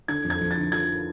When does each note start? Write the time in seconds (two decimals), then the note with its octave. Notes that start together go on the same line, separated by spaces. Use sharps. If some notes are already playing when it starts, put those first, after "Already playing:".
0.08 D3 G#6
0.24 F2
0.30 G#6
0.41 F2
0.51 A6
0.57 D3
0.72 F3 G#6